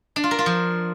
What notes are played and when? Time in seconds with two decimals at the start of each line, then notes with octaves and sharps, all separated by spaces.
0.16 D4
0.24 F4
0.31 A#4
0.39 F4
0.46 F3